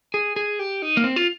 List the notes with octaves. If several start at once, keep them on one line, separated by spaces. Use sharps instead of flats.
G#4
G#4
G4
D#4
A#3
C4
F4